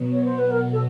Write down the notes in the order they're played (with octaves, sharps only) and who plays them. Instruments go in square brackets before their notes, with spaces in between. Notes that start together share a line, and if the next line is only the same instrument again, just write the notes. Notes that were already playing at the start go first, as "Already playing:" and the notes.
Already playing: [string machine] B2 F#3 B3
[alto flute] C#5
C5
B4
A#4
A4